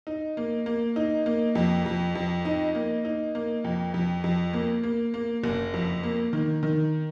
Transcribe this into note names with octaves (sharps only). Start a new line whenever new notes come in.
D#4
A#3
A#3
D#4
A#3
F2
F2
F2
D#4
A#3
D#4
A#3
F2
F2
F2
A#3
A#3
A#3
F#1
F2
A#3
D#3
D#3